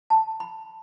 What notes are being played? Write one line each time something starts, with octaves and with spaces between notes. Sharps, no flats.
A5
B5